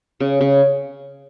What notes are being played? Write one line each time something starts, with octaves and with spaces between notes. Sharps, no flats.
C#3
C#3